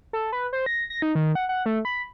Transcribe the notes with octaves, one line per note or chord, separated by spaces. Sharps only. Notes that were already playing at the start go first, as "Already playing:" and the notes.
A4
B4
C5
A#6
A#6
D#4
D#3
F#5
F#5
A3
B5